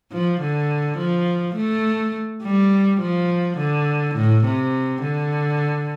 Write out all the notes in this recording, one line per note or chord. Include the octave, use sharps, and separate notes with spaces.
F3
D3
F3
A3
G3
F3
D3
A2
C3
D3